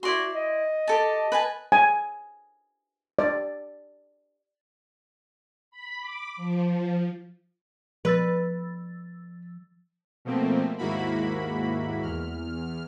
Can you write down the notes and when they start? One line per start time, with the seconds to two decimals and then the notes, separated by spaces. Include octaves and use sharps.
0.03 E4 F#4 D5 C6
0.35 D#5
0.88 G4 A4 A5
1.32 B4 G#5 A5
1.72 G#5
3.19 D5
5.71 B5
6.01 D6
6.37 F3
8.05 F3 B4 E6 A6
10.25 B2 F3 A3 A#3 C4
10.78 D#2 G#2 A#3 E4 F#4 B5
12.02 E2 F6